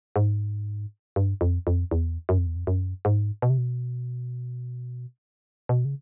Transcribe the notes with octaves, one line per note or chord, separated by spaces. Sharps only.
G#2
G2
F2
F2
E2
F#2
F2
E2
F2
F#2
G#2
B2
C3
B2
B2
C#3